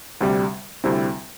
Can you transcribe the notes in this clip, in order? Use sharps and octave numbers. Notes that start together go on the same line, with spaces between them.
D2 C3 G3
D2 C3 G3 C4 E4